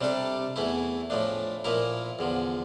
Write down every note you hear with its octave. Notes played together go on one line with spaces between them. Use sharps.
C3 G3 D4 A4
E2 E3 A3 E4
A2 F3 A3 D4
A#2 F3 A#3 E4 A#4
E2 D3 F3